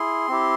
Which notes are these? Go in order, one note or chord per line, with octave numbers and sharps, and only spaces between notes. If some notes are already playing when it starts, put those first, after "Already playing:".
Already playing: E4 G#4 C6
C4 E4 G4